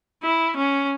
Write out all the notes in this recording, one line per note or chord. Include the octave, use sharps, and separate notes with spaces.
E4
C#4